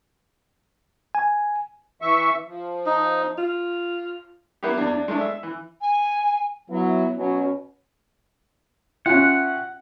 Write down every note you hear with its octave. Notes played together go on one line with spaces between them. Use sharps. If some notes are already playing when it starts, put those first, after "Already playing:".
G#5
E3 E5 C#6
F3
D#4
F4
A#3 B3 E4 G4
E2 D4
D4
G#3 A3 D4
E5
E3
G#5
F#3 B3 E4
B2 F#3 C#4
C#4 F4 E5 F#5 G5 F#6